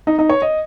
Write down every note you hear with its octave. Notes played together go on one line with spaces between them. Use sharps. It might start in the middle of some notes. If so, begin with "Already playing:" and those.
D#4
D#4
C#5
D#5